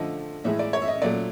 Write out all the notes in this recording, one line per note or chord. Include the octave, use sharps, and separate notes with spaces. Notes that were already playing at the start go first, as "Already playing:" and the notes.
Already playing: D3 F3 A3 D#5
A2 E3 G#3 E5
D5
C#5
E5
D#5
A#2 F#3 A3 D5